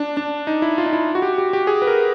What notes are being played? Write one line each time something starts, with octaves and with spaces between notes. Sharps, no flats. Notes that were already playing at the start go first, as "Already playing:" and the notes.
Already playing: D4
D4
D#4
E4
F4
D#4
E4
F#4
G4
G4
G4
G#4
B4
A#4